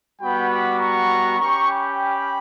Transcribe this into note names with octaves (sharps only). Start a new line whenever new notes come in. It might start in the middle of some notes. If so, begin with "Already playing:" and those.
G3 B3 F#4 G5 B5
B5 D6
A#5 C#6
C#4 G4 A#5 C#6
G5 B5